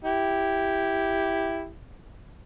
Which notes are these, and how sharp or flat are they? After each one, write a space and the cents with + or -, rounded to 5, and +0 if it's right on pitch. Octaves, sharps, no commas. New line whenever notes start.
E4 +0 G4 +0